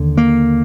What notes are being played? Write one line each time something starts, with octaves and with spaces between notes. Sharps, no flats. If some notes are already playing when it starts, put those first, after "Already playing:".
Already playing: D#2 D3
A#3